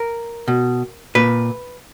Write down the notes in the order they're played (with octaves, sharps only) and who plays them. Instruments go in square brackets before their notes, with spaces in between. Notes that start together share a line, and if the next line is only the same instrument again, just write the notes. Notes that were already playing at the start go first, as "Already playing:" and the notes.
Already playing: [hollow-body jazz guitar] A#4
B2
A#2 B4